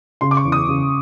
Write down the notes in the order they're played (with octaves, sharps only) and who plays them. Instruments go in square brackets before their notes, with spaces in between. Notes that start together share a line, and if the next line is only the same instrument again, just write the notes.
[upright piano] C#3 [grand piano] C6
[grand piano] D6
C#6
[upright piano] E2
[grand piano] D#6
[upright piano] C#3